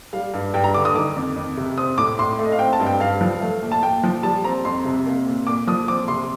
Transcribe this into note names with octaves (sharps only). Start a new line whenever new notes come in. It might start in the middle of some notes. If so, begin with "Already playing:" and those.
G3 F5
G2
G2 G5
A#5
D3 D6
D#6
D#3 D6
F2
F2
C3
C4 D#6
A2 D6
A2 C6
A3
D#5
F5
C4 G5
A5
G2
G5
G2 F5
F3
A3
A#2
A5
A#2 G5
F3
G3 A5
C4 A#5
F2 C6
C3
A#3
A#2
A#2 D6
F3 D#6
C4 D6
C3 C6